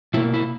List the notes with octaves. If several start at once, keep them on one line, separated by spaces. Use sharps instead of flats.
B2 A#3 E4
E4